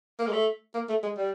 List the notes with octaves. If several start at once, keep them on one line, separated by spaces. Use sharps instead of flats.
A#3
G#3
A3
A#3
A3
G#3
G3